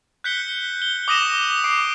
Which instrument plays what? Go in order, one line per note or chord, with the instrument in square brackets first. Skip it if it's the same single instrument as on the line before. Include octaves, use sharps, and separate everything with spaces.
[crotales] F#6 G6 B6 C#7 G7
G7
D6 D#6 A#6 D#7 E7 G7
D6 C7 D7